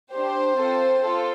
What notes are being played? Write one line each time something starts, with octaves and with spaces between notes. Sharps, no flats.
D4 G4 C5
C4 F4 A4
F4 A4